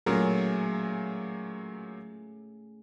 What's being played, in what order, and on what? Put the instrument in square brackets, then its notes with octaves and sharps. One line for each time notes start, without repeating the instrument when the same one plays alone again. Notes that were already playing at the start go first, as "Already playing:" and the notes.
[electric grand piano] A#2 F#3 A#4 [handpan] A3 C#4 G#4